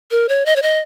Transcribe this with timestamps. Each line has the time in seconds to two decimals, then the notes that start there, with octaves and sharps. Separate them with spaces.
0.11 A#4
0.29 C#5
0.46 D#5
0.56 C#5
0.62 D#5